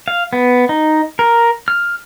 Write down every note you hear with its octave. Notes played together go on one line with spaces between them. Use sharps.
F5
B3
D#4
A#4
F6